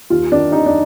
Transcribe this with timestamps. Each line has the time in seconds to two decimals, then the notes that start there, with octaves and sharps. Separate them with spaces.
0.10 D#2 F4
0.32 D#3 D4
0.52 D#2 D#4
0.66 D4